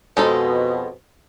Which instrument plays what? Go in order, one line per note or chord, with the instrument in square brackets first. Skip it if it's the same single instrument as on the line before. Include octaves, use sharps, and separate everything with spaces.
[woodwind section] F2 B2 [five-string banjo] G#3 D#4 A4